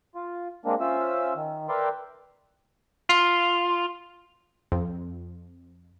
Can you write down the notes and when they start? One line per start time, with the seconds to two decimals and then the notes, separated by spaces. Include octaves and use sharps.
0.15 F4
0.65 G#3 A#3 C4 D4
0.80 C#4 F4 C5 E5 E6
1.36 D#3
1.69 A#4 B4 D5 E5 G5 C6
3.09 F4
4.72 F2